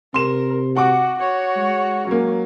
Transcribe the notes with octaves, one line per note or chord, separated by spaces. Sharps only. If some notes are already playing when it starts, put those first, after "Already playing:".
C3 A#4 C6 E7
F#4 F#5 C#6 D6
F#4 C#5
G#3
F#3 A#3 C#4